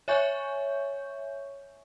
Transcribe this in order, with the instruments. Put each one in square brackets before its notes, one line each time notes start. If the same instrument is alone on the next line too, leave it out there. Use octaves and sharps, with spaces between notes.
[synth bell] C#5 E5 G#5 C#6 G6